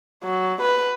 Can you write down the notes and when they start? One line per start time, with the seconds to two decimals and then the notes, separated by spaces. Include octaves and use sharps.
0.24 F#3
0.61 B4